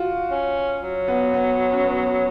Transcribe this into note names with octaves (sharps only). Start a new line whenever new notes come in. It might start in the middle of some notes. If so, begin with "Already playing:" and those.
Already playing: F4 F#4
C#4
F#3
B3
B3
C#4
B3